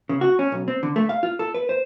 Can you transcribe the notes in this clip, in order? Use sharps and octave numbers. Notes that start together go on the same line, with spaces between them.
C#3
F#4
C#4
B1
C4
D3
A3
F5
F4
A4
B4
C5